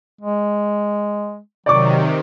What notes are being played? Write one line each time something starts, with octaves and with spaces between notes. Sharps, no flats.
G#3
C3 D#3 F#3 D5 C#6 D6